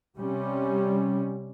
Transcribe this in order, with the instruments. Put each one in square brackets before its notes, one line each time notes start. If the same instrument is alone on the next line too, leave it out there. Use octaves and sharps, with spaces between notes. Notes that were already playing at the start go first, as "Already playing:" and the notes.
[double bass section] C3 G3 C#4